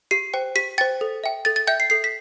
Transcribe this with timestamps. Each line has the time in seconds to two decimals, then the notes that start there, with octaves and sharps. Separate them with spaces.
0.11 G4 C7
0.34 C5 G5
0.55 G4 B6
0.78 C5 G5 A6
1.01 A4
1.24 E5 G5
1.45 A4 A6
1.56 A6
1.67 E5 G5 G6
1.80 C7
1.90 A4 C7
2.04 B6